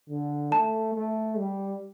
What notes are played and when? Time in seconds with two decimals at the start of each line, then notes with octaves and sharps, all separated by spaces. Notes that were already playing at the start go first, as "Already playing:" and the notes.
0.09 D3
0.52 A3 A5
0.94 A3
1.37 G3